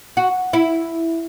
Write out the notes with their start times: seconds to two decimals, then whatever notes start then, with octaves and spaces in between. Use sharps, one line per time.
0.17 F#4
0.53 E4